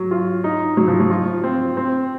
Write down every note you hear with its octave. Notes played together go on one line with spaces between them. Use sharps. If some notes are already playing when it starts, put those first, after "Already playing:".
Already playing: F#3
F4
D#4
F#3
F3
F#3
F4
C4
C4